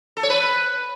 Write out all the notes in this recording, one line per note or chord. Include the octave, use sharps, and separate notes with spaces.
A4
C#5
B4